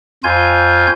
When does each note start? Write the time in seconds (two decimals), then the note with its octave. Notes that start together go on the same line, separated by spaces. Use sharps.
0.24 F2 F4 G#5 G6